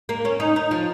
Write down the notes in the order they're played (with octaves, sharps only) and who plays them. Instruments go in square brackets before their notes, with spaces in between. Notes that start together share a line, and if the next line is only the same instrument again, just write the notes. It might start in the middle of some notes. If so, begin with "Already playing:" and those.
[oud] A#3
C#4
D#4
D#4
F3